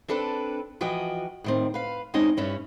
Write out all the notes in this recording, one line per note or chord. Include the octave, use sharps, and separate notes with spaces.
C4 D4 A4 B4 D5
E3 F3 F#4 D#5 G5
A2 D#3 C4
B4 F5
E2 G#3 C4 C#4 D#4 D#5
G2 C#4 E4